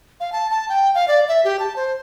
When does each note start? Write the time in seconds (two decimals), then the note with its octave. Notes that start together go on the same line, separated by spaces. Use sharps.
0.20 F5
0.32 A5
0.50 A5
0.69 G5
0.95 F5
1.08 D5
1.28 E5
1.45 G4
1.60 A5
1.76 C5